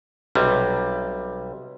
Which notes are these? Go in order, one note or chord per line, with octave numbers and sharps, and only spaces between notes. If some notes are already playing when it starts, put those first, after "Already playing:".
B1 C3 G3